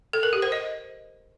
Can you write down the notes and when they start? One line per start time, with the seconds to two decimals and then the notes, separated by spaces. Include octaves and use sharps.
0.13 A4
0.23 A#4
0.33 G4
0.42 C5
0.52 D#5